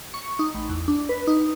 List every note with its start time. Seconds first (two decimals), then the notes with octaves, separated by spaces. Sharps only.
0.14 C#6
0.39 D#4
0.54 A1
0.69 E2
0.88 D4
1.09 B4
1.27 D#4